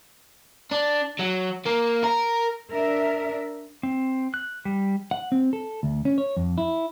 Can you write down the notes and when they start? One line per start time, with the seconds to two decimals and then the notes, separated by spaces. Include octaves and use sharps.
0.71 D4
1.19 F#3
1.65 A#3
2.04 A#4
2.72 D4 A#4 E5
3.83 C4
4.34 F#6
4.65 G3
5.11 F#5
5.32 C4
5.53 A4
5.83 D2
6.05 C#4
6.18 C#5
6.37 F2
6.58 E4